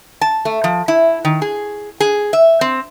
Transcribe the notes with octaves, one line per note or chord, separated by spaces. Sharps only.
A5
A3
F3
E4
D#3
G#4
G#4
E5
C4